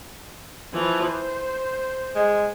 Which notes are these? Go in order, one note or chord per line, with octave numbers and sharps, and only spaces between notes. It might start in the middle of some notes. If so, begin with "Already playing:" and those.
E3 F3
C5
G#3